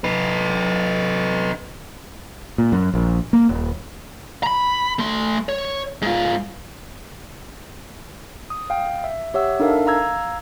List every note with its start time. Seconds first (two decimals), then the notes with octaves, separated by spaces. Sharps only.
0.04 D#4 B4
2.58 A#2
2.72 F#2
2.93 A#1
3.33 A#3
3.49 D#1
4.43 A#5 B5
4.99 A3 C6
5.49 C#5
6.02 G#2 F4
8.50 D#6
8.70 F5 G5
9.04 E5
9.34 G4 C#5 E5 F#5 E6
9.60 D4 D#4 A4 A#4 E5 F5
9.87 F5 A#5 E6 G#6